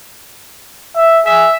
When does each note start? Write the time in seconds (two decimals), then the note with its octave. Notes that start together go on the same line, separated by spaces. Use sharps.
0.96 E5
1.26 G#4 E5